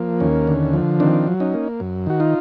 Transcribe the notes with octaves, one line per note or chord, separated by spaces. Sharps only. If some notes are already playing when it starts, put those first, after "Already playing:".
Already playing: F3 A#3
D#2 C#4
D3
F3
D#3 C4 D4
F#3
C#4 D#4
A#3
F#2
D#3 F#4
D#4 F4